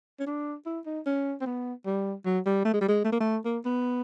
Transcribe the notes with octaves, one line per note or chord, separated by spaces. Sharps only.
C#4
D4
E4
D#4
C#4
C4
B3
G3
F#3
G3
A3
G#3
G3
G#3
A3
A#3
A3
A#3
B3